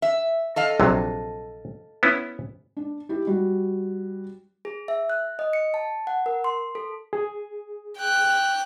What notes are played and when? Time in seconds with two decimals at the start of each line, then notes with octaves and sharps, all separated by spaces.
0.02 E5
0.56 A4 D#5 F5
0.80 A#1 C3 F#3
2.03 B3 C#4 E4
2.77 D4
3.09 E4 G4
3.27 G3 F#4
4.65 G#4
4.88 E5
5.10 F#6
5.39 D#5
5.53 C#7
5.74 A5
6.07 F#5
6.26 A#4
6.44 C6
6.75 A4
7.13 G#4
7.99 G5 F#6